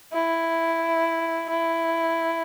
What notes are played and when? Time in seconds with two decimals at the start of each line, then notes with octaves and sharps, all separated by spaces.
0.13 E4
1.50 E4